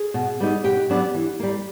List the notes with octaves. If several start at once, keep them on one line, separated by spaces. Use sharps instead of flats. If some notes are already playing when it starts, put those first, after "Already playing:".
Already playing: G#4
B2
G3 B3 D#4
B2 G4 G5
F#3 B3 D4
E3
G3 A#3